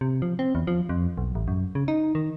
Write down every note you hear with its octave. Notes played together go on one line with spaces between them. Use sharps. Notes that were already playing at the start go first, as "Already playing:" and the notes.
C3
F3
C4
E2
F3
F2
B1
A1
F#2
C#3
D#4
D#3